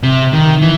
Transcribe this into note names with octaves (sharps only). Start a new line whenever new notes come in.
C3
D#3
E3